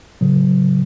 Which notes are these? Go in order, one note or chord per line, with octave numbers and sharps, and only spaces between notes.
A2 C#3 F#3